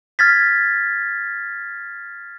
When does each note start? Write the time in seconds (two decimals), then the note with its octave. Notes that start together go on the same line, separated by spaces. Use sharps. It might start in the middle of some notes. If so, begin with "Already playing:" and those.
0.19 F6 G#6 A6 B6